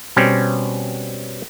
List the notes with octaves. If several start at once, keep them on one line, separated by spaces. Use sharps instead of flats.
B2 G3 C4 C#4